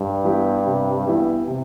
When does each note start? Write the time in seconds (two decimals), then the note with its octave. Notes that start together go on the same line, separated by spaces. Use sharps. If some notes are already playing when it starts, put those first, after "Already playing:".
Already playing: G2
0.24 E3 B3 E4 G4
0.66 C3
1.06 E3 B3 E4 G4
1.48 C3